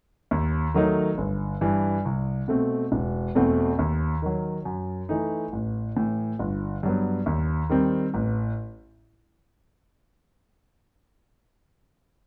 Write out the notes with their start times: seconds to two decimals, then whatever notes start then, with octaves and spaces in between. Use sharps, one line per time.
0.31 D#2
0.74 D#3 F#3 A3 D#4
1.18 G1
1.61 G2 E3
2.05 C2
2.48 B2 A3 C4
2.92 E1
3.35 E2 B2 A3 C4
3.79 D#2
4.22 D#3 F#3
4.65 F#2
5.09 E3 A3 D#4
5.53 A1
5.97 A2 E3
6.39 G1
6.83 G2 F#3 B3
7.26 D#2
7.70 D#3 G3 C4
8.14 A1